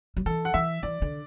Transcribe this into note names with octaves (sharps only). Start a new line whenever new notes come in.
F#3
E3 A4
F#5
E3 E5
E3 D5
D3